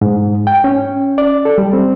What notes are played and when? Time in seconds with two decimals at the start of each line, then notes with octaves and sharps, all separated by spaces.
0.01 G#2
0.47 G5
0.64 C#4
1.18 D5
1.45 A4
1.58 G3
1.73 C4